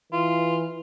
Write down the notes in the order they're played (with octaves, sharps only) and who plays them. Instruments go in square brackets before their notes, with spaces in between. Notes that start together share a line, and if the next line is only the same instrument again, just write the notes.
[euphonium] E3 [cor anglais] F4